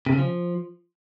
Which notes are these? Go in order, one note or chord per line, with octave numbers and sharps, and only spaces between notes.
C3
C#3
F3